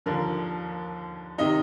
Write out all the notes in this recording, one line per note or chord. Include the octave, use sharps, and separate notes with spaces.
D#2 D3 F3 A#4
C3 D#3 D#4 D#5